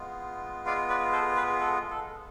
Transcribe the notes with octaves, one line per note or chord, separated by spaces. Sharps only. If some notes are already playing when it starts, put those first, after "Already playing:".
Already playing: G#3 B3 F4
D5 F5
B4 D5
A4 C5
G#4 B4
A4
A4